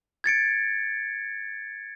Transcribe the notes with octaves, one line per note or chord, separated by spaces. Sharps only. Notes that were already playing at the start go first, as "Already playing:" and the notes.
G#6 A6 C#7 D7